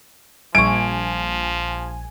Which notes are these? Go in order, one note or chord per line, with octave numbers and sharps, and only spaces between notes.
A#1 F3 G3 G#5 C#6 D7